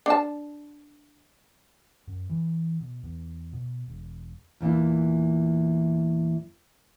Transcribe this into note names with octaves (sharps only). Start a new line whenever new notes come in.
D4 A5
F#2
E3
B2
E2
B2
E1
E2 A#2 E3 E4